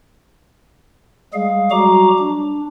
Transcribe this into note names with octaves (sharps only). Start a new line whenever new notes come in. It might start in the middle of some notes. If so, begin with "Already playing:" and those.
G3 G#3 G#4 F5
F#3 G3 F#4 A#5 D6
D4